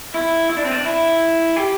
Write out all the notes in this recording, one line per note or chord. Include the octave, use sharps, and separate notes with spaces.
E4
E4
D4
C4
D4
E4
G4